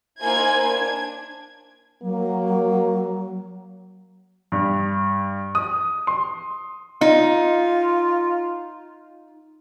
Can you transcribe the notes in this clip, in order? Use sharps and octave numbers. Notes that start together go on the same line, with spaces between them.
A#3 D#4 E4 C5 G#5 G#6
D4 G#6
F#3 A#3
G2
D#6
C6
D#4 F4